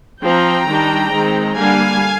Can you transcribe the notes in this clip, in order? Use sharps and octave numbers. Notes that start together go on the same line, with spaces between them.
F3 C4 G5 A#5
D#3 G3 D4
D#3 G#3 C4
D3 G3 A#3 D4 F5 G#5